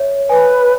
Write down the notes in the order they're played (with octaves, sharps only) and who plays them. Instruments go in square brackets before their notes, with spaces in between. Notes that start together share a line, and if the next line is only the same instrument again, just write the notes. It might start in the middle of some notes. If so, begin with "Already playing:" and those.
Already playing: [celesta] C#5 E5
[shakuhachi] B4 [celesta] G#5